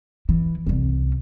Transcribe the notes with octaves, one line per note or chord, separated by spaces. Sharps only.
E3
C2 C#4